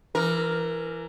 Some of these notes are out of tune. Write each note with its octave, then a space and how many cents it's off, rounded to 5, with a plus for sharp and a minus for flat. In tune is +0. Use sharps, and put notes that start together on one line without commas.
E3 +25 A#4 +0